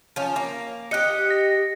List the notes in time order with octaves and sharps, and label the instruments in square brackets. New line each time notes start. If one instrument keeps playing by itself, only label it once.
[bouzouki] F3 C#4
A#3
[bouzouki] G4 D#5 [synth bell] F#6 C#7
[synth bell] A#6